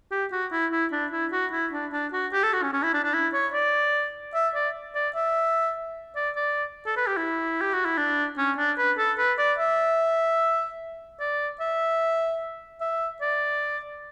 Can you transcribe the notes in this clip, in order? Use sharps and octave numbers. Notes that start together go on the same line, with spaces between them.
G4
F#4
E4
E4
D4
E4
F#4
E4
D4
D4
F#4
G4
A4
F#4
C#4
C#4
E4
D4
D4
E4
C#5
D5
E5
D5
D5
E5
D5
D5
A4
B4
G4
E4
G4
F#4
E4
D4
C#4
D4
B4
A4
B4
D5
E5
D5
E5
E5
D5